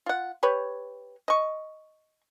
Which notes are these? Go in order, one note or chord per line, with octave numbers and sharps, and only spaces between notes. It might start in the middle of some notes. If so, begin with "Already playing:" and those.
F4 F#5
G4 B4 C#5
D#5 C#6